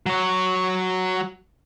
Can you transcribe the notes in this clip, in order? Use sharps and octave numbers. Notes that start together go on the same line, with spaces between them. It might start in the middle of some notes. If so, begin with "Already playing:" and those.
F#3 C#5